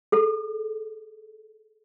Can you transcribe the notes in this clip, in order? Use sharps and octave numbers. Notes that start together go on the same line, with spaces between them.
G#4 A4